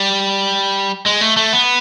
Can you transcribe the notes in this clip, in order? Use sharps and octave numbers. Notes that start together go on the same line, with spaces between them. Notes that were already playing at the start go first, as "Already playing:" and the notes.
Already playing: G3
G#3
A3
A3
B3